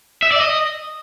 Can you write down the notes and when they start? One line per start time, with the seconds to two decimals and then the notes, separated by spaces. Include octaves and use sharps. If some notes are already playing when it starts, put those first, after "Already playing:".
0.22 E5
0.32 D5
0.41 D#5